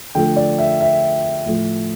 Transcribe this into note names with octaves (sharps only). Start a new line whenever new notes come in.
D3 F3 A3 G5
D5
E5
E5
A2 F3 A3